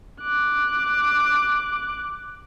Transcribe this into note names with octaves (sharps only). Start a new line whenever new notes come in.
D6 F#6